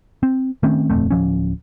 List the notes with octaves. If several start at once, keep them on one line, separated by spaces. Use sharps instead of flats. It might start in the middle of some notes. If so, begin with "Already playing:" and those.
C4
D#3 A3 C4 C#4
D#1 F2 A3 C4
D1 F#2 F3 C#4